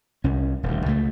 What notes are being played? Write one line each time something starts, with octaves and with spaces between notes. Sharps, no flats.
C2 C#4
D#1 D2
C#2 A3